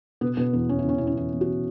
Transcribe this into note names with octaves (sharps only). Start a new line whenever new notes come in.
B2 B3
B2 B3
E2 B3
E2 C#4
E4
B2 C#4
B2 E4
C#4
E2 E4
E2
F#4
B2